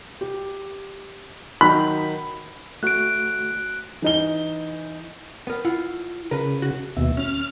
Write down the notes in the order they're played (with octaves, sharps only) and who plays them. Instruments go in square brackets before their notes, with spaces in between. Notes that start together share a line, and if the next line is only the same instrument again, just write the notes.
[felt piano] G4
[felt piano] D#3 F#3 D#4 [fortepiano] B5
[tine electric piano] A3 F#4 [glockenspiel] F#6 D7
[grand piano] E3 D#4 G7
[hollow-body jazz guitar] B3 A#4
E4 F4 F#5
[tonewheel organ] C#3 [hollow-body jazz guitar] A#4 B4
[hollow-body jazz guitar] F#4
[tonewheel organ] D#2 B2 [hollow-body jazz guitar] E5
[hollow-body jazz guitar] C#4 [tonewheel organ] F6